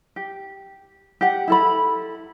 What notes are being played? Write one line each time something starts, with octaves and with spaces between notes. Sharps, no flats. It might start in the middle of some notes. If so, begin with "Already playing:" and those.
G4
G4 F#5
E4 A4 B5